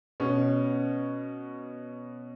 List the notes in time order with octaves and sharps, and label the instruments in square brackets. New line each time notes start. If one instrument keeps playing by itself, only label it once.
[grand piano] B2 C#4